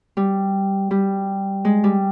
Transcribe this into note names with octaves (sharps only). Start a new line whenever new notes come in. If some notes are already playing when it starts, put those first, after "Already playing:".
G3
G3
G#3
G3